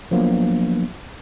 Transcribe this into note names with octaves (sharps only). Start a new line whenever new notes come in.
F3 F#3 A#3 B3 D4